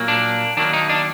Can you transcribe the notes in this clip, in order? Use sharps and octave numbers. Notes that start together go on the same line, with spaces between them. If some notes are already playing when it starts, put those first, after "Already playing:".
Already playing: A#2 F#3 A#3
D4
D#3 F#3 A#3 D4
D#4
D4